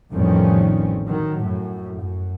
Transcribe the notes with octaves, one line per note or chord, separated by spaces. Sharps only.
A1 F2 D#3 G3 C4 C#4
D#3 F#3
F#2 A2
F#2